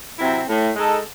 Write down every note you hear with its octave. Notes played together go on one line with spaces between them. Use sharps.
C3 F#3 C4 E4
A2
G#3 D#4 A4